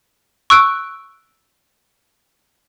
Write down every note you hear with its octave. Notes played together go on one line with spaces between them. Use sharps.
C#6 E6 F#6 D7